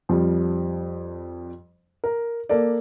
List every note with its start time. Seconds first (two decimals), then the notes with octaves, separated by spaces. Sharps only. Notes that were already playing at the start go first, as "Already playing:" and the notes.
0.09 F2 F3 G3
2.04 A#4
2.49 A#3 A4 D5